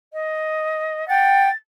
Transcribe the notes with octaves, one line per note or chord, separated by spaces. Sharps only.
D#5
F#5 G5 A6